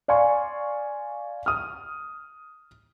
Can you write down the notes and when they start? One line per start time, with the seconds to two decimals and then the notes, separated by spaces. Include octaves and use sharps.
0.08 D5 F5 G#5 C6 C#6
1.46 D#6 F6